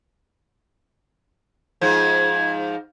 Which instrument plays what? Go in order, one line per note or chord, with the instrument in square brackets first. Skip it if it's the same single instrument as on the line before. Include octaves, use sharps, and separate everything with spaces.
[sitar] G#2 F3 [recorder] G#6